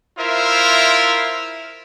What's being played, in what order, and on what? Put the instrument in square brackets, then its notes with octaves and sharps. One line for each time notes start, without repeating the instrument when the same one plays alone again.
[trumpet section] E4 F4 A#4 C5 E5